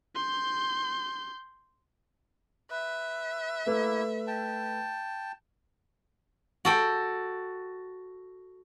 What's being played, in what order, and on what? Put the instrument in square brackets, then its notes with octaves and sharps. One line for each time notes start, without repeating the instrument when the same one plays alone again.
[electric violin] C6 G6
[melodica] B4 [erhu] E5
[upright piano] A3 B4 [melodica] A#3 E4
[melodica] G5 A5
[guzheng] F#4 A4 G5